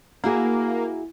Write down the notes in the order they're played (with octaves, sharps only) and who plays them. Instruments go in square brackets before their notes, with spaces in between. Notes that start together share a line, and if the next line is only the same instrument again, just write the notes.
[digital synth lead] A#3 [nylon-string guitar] E4 F#4 G#4